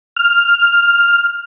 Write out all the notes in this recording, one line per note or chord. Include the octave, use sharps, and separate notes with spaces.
F6